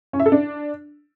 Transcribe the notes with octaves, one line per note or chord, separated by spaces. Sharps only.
C#4
E5
A4
D4